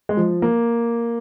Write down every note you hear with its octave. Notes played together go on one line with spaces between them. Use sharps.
G#3
F3
A#3